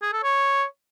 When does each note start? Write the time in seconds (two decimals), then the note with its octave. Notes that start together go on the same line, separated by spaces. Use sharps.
0.02 G#4
0.13 A4
0.23 C#5